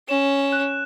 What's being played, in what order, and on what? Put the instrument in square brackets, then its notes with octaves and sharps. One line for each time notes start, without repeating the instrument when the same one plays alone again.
[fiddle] C#4 [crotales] E7
[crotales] F#6